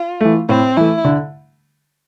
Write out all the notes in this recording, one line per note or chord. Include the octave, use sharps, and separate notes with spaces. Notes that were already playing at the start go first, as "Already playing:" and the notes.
Already playing: F4
E3 A3
A2 C4
E3 A3 E4
D3